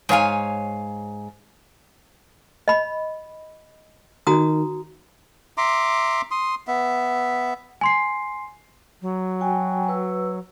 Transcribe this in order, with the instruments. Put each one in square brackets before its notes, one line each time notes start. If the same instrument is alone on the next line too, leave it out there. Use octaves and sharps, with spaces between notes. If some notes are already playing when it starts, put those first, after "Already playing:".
[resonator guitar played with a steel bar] G#2 C#5 F5 G#5
[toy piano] D#5 B5
[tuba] D#3 [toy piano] F#4 A#5 D#6
[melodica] E5 A#5 C6 D6
C6 D#6
B3 E5
[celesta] G#5 C6 C7
[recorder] F#3
[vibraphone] F#4 G5 G#5
B4 E6